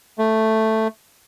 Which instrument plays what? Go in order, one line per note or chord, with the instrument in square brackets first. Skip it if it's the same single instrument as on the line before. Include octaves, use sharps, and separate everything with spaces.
[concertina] A3